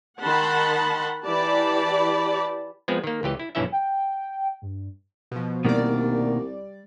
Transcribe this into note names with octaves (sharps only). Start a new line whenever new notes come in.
D#3 F#5 A5 B5 C6
E3 G4 D5 A5 B5
F3 G#3 B3 C4 B4
D#3 A#3
C#2 E3 G4 D#5
E4
B1 G2 E3 C#4 E4 E5
G5
G2
B2 F3
C2 B2 D#3 G3 A#3 D5